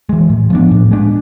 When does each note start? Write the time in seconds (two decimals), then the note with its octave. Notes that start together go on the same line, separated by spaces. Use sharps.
0.09 E3 G#3
0.30 A2
0.50 F3 B3 D4
0.71 A2
0.91 G#3 D4